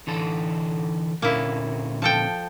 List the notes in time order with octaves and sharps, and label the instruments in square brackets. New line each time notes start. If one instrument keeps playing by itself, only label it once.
[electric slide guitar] D3 E3 A4
[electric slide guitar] A#2 D3 C#4 [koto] A#3 E4
[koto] F3 A4 G5